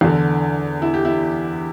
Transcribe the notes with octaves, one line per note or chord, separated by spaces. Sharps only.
E2 D3
E4
G4
E4